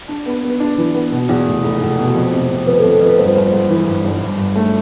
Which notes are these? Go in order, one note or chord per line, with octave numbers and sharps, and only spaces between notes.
D4
B3
B3
D4 D5
E3
B3
B2
E2
F1
F1
F1
B2
F2
C3
C3
F2 B4
A4
F2
A4
F2 B4
G1 C5
B4
G1 C5
G1
E3
G2
G1
G2
G2
A3